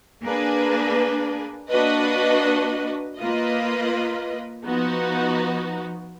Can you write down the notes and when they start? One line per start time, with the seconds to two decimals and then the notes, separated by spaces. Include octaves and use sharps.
0.23 A#3 D4 G#4 B4
1.70 A#3 D4 F#4 B4 D#5
3.17 A#3 F4 B4 D#5
4.64 F3 B3 D#4 F#4